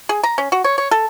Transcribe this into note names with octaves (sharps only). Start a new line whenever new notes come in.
G#4
A#5
C#4
F#4
C#5
C#5
A4